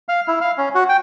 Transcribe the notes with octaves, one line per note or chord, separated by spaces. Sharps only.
F5
E4
F5
C#4
F#4
G5